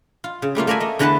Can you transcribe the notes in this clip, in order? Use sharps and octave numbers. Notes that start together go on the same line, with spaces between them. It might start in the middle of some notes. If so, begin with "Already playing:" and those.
F4
C#3
G3 A3 A#3 F4
A3 A#3 A#4 D5 E5 G#5
A3 D#5
E2 D3 E3 B4 F#5 A5